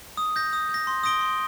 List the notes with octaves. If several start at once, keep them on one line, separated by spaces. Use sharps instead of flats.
D#6
G6 A#6
D#6
G6
A#6
C6
D#6 A#6 D7 G7
C6